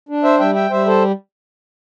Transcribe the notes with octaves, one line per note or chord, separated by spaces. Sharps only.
D4
C5 E5
G3 E5 G5
E5 G5
G3 C5 E5
A4 C5